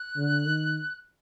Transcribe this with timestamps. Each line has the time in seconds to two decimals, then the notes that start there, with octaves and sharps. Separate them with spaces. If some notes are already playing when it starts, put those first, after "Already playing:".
Already playing: F#6
0.16 D3
0.46 D#3